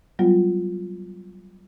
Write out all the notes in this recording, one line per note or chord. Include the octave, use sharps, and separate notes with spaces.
F#3 G3 B3 F4